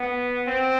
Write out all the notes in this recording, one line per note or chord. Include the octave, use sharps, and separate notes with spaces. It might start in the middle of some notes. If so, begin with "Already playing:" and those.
Already playing: B3
C4